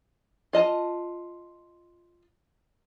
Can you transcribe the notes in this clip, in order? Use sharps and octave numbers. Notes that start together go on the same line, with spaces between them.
F4 D#5 A5